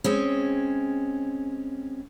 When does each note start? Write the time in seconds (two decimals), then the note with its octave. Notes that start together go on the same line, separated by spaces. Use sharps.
0.04 G#3 C4 C#4